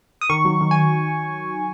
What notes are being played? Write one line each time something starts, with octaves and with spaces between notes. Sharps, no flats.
D#6
D#3 C#6
F#3
D#3
G#5